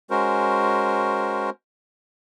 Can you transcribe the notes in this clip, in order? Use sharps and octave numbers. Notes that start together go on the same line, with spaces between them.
G#3 C#4 F#4 A#4 C5